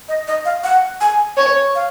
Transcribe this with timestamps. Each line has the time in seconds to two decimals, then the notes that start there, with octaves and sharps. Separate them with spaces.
0.09 D#5
0.28 D#5
0.45 F5
0.64 F#5
1.01 G#5
1.37 C#5
1.75 F5